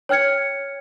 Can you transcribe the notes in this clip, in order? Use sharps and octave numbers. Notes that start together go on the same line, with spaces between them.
C#5 G5 F6 G#6 C#7